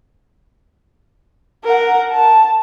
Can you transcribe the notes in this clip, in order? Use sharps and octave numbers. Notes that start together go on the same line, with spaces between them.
A#4 F#5
A5